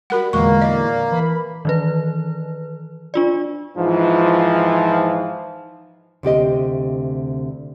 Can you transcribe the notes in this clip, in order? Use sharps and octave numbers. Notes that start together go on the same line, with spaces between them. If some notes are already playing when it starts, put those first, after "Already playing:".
G3 F#4 A#4 F#5 B5
E2 A#2 D3 G#3 A#3 A#4 C#6
D5 D#5
E3 B5
D#3 E3 B4
D4 F4 D5
G#2 E3 F3
D2 C3 G4 D#5